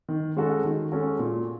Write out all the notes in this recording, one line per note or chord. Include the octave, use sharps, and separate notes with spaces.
D#3
G#3 C#4 F#4 A4
D#3
G#3 C#4 F#4 A4
A#2